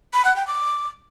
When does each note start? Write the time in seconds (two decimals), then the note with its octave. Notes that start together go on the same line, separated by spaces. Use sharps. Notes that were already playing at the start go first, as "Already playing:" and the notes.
0.14 B5
0.25 F#5
0.36 G5
0.47 D6